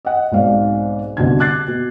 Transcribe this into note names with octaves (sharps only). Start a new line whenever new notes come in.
D#5 F#5
B1 G#2 C4 D5 F5
C2 B2 D3 G#6
D6 F#6 G#6 A6 C7
B2